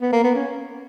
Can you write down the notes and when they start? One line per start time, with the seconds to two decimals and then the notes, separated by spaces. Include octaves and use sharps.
0.01 B3
0.13 A#3
0.24 B3
0.35 C#4